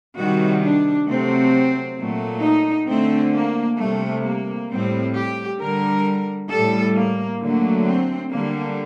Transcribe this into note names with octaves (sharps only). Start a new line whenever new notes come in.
C3 D#3 G3 F#4
D4
C3 F#3 A3 C4
A#2 F#3 A3
D#4
D3 A3 C4
A#3
C3 G3 A3
A#3
A2 G3 C4
G4
D3 G3 A#4
A2 G3 A4
A#3
D3 F#3 A3 A#3
C4
D3 G3 A#3